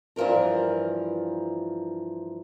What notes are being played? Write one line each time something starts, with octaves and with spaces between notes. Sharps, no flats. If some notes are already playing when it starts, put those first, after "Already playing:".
G2 E3 F3 A#4 A#5